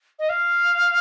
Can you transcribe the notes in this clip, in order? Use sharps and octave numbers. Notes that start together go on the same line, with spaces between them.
D#5
F5